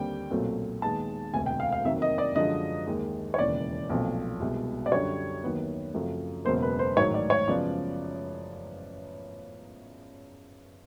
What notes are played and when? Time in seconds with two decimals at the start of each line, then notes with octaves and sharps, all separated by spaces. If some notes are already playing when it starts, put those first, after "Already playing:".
Already playing: D#2 D3 G3 C4 G5
0.31 B1 A#2 F#3 A3 C4
0.82 D#2 D#3 G#3 B3 A5
1.33 E1 D2 C3 G#5
1.46 G5
1.60 F5
1.72 F5
1.85 F2 C3 D#3 F#3 A#3 E5
2.02 D#5
2.18 D5
2.35 F#2 D3 F3 G#3 D#5
2.87 D#2 D#3 G#3
3.34 C#5
3.38 E1 D#2 C#3 E3 D5
3.90 B1 A#2 F3 A3 C4
4.40 C2 B2 G#3
4.86 D5
4.91 F#2 D3 G3 C#5
5.43 D#2 D#3 F#3 B3
5.94 F#2 C#3 F3 A3 C4
6.45 E1 E2 C#3 F#3 A#3 C5
6.63 B4
6.79 C5
6.97 A1 G#2 D#3 F#3 C#5
7.14 D5
7.30 C#5
7.48 F#2 C#3 F3 G#3 B3 D5